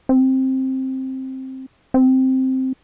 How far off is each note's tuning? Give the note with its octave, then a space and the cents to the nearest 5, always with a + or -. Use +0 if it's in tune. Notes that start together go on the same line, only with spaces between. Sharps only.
C4 +10
C4 +0